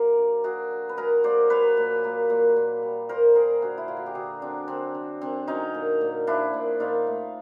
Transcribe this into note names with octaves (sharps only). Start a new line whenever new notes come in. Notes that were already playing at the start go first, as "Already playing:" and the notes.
Already playing: F#3 A#3 A#4 C5 D5
D3
A#3 F#4 G#4
F#3
B4
F#3 G#4 A#4
A#3 C5 D5
A#3 B4 C#5
A#2
A#3
A#2
A#2
G3
A#2 A#4 C5
G3 G#4 A#4
D3 F#4 G#4
E4
D3 F4
F#4
G4
D3 F#4 G#4
F#3 C4 D4
D3 C4
D3
D3 C4
F#3 C#4 D#4
A#2
A#2
F3 D4 E4
A#2
A#2 D#4 F4
A3